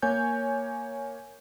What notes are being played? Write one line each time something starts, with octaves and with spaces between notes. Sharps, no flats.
A#3 C#5 G#5 G6